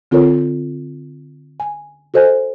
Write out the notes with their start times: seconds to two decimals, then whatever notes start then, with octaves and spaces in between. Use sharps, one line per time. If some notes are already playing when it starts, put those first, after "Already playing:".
0.11 D3 C4 F4 A4 A#4 C#5
1.60 G#5
2.14 F#4 A4 C5 D#5 G#5